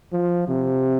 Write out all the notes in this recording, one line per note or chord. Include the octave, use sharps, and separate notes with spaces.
F3
C3